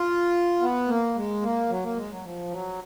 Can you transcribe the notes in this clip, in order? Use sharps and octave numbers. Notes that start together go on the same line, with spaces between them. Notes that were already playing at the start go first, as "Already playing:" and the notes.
Already playing: F4
B3
A#3
G#3
A#3
F#3
A#3
G#3
F#3
F3
F#3